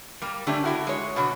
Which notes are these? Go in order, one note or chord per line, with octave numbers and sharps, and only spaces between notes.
G3 A#3
D3 A3 C#4 D4 G4
D3 E4 F#4
G#3 C#5
B2 D3 F#4